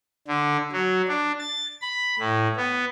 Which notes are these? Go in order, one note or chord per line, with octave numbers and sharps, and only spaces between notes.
D3
F#3
D4
A6
B5
A2
B3